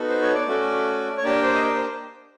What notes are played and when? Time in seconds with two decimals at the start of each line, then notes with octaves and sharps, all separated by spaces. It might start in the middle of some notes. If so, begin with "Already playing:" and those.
Already playing: B3 D#4 F#4 A4
0.09 C5
0.22 C#5
0.34 D5
0.47 A3 C#4 F#4 A4
1.17 C#5
1.24 A#3 D4 G4 D5
1.43 C5
1.54 D#5
1.62 D5
1.74 C5